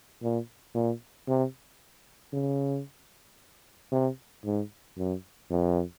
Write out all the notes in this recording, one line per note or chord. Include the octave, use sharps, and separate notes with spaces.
A#2
A#2
C3
C#3
C3
G#2
F#2
F2